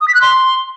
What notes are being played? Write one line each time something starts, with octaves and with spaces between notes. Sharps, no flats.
D#6
B6
F#6
C6